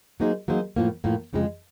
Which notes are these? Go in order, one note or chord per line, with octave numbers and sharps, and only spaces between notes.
F#3 A#3 D#4 G#4 C5
F#3 A#3 D#4 G#4 C5
A2 F3 A#3
A2 F3 A#3
F2 C#3 F3 G#3